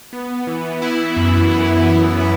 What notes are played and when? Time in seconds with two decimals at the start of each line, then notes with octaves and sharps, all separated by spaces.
0.13 B3
0.47 E3
0.82 E4
1.16 F#2
1.51 B3
1.86 E3
2.20 E4